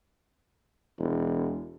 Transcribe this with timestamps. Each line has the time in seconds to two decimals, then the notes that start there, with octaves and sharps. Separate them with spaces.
0.98 E1